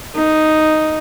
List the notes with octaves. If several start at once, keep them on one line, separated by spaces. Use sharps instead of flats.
D#4